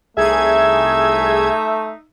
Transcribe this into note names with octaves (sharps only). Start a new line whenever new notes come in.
C2 A3 D#4 G#4 E5 G#6